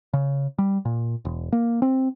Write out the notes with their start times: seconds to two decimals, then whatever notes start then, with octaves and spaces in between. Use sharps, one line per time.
0.13 C#3
0.58 G3
0.85 A#2
1.25 E1
1.52 A#3
1.82 C4